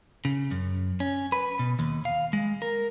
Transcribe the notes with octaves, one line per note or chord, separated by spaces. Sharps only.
C#3
F#2
C#4
B4
B2
D#2
F5
G#3
A#4